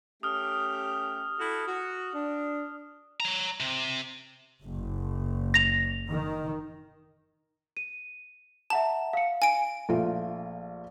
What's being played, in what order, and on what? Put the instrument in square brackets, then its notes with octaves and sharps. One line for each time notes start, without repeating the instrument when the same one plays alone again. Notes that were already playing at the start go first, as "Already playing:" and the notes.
[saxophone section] A3 C#4 G4 [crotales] D#6 F6
[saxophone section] E4 F#4 A4
F#4
D4
[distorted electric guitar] C#5 A#5
C3
[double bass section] F#1
[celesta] A#6 F7
[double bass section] D#3
[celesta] D#7
[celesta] E5 F#5 A#5 [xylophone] A5
[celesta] F5 C#7
[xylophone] G#5 D7
[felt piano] A#1 A3 F4